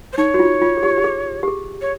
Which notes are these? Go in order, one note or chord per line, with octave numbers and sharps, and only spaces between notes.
C5
D#4 C#5
F#4
F4
F4
G#4
G4
G4
G#4
G4
G#4
C#5